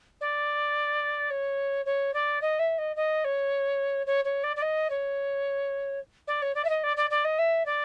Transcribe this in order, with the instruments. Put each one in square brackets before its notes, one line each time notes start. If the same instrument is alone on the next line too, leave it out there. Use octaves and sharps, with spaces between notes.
[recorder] D5
C#5
C#5
D5
D#5
E5
D#5
D#5
C#5
C#5
C#5
D5
D5
D#5
C#5
D5
C#5
D5
E5
D#5
D5
D5
D5
D#5
E5
D5